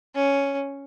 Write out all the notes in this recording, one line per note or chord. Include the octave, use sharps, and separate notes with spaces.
C#4